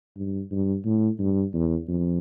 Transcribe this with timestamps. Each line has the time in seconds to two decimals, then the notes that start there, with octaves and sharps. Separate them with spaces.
0.17 G2
0.51 G2
0.85 A2
1.19 G2
1.54 E2
1.88 F2